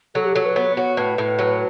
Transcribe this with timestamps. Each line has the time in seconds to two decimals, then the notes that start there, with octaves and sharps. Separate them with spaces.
0.15 F#3 A4
0.25 G4
0.35 F#3 A4
0.46 B4
0.56 B3 C#5
0.77 F#4 C#5
0.97 A2 B4
1.18 A2
1.39 F#3